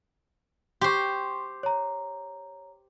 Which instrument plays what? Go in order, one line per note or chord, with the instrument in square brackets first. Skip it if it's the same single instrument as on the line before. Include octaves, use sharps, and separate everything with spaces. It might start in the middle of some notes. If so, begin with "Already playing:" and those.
[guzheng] G4 C5 [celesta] C6 C#6
[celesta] C#5 A#5